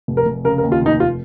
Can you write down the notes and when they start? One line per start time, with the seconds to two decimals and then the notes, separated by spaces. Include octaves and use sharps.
0.08 F1
0.17 A#4
0.26 F1
0.44 C#3 A#4
0.58 A#4
0.63 D#2
0.72 F4
0.82 F1 D#4
1.00 F4